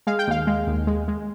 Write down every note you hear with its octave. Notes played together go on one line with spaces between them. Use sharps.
G#3 F5
G5
D#2 F5
G#3
D#2
G#3
G#3